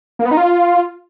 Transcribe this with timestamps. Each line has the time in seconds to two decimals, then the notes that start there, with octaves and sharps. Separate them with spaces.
0.19 A#3
0.25 B3
0.31 D#4
0.37 F4